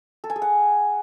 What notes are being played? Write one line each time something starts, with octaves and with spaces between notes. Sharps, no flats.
A4
G#5
G#4
F#5